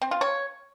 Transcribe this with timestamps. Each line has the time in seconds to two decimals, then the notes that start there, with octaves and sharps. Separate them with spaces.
0.02 C4
0.11 F4
0.21 C#5